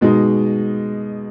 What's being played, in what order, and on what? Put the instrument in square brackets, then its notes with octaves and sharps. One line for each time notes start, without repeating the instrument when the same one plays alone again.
[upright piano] B2 G#3 D#4